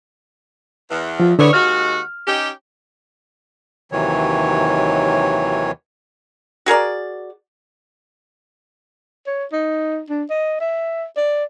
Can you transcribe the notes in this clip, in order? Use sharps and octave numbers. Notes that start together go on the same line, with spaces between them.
E2
F3 F4
D3 E4 G#4 B4 C#5 D5
D#2 G#3 F#4 F6
C#4 D#4 G4
D#2 C3 D#3 E3 F#3 C#5
F#4 G#4 A#4 D5
C#5
D#4
D4
D#5
E5
D5